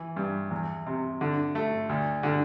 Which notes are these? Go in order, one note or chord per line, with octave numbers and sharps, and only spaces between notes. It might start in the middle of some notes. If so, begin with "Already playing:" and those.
Already playing: E3
G2
E2
C3
D3
A3
D2
D3